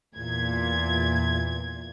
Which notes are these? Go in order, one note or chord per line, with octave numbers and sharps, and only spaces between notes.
E2 A#2 G#6